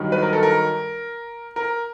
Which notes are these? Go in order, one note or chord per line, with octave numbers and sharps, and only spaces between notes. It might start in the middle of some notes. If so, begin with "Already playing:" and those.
Already playing: G2 D#3 F#3
B4
A#4
A4
A#4
A#4